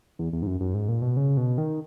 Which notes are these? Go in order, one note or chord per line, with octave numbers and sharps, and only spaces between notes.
E2
E2
G#2
F#2
F#2
G#2
A#2
B2
C#3
B2
D#3